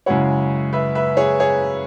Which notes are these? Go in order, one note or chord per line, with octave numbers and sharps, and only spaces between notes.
F#2 C#3 G#3 E4 C#5 F#5
B4 E5
B4 E5
G#4 C#5
G#4 C#5